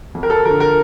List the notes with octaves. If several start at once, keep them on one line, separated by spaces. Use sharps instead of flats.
F2
A#4
A4
D3 F3 A#4
A#4